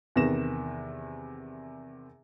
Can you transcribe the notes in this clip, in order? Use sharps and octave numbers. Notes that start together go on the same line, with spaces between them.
E2 C3 D#3 B4 A#6 E7